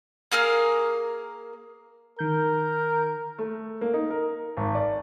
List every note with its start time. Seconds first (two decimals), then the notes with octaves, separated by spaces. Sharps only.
0.32 A#3 G#4 A#4 F6
2.19 D#3 A#4 G6
3.38 A3
3.81 A#3
3.94 D#4
4.10 A#4
4.57 G#1
4.75 D5